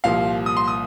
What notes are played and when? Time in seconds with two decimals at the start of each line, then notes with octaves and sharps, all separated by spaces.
0.04 C2 A#2 F3 F5
0.46 D#6
0.57 C6
0.68 D#6